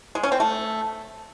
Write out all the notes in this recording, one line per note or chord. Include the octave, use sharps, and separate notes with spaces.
G#3
C#4
C4
A3